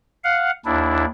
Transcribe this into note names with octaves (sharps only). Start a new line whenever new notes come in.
F5 F#5
D#2 D4 E4